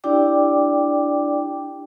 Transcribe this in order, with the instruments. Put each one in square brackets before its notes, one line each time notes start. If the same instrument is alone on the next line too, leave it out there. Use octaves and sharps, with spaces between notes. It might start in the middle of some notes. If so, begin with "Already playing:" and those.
[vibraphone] D4 E4 G4 D5 G5 D6